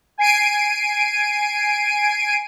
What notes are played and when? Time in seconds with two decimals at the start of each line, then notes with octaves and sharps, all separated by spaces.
0.18 G#5 G#6 C7 D7 D#7